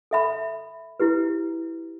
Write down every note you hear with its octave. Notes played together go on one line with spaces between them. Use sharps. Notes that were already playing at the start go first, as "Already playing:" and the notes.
A4 E5 B5
E4 G4 B4